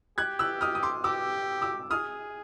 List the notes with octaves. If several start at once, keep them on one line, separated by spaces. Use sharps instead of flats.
G4 F#6 G#6
E6 F#6
D#6 F6
D#6
C6 D6
G4 D6 E6
D6 E6
G#4 D#6 F6